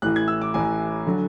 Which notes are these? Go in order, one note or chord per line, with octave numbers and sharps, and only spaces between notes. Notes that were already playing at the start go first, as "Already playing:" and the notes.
A1 A2 E3 F#6
G#6
E6
D6
A1 A2 E3 G#5
D3 F#3